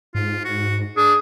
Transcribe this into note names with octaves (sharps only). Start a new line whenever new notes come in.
G#2 F4
F#4
D4 G#4